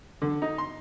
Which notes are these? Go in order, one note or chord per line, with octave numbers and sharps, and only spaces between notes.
D3
D#4
C6